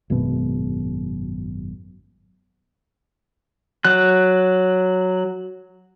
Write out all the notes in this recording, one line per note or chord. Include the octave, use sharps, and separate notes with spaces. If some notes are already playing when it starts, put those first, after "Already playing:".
G#1 F#2 B2
F#3 F#6